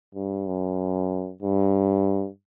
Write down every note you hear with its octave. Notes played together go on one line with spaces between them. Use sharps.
G2
F#2
G2